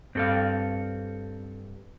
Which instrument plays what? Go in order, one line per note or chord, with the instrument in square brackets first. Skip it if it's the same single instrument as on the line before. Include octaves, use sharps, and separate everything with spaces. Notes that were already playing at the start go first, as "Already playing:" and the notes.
[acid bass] G2 [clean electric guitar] C4 A4 F5